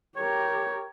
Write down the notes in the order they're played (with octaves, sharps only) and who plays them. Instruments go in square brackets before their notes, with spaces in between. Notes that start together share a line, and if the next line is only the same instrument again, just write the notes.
[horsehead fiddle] G4 A#4 [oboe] C#5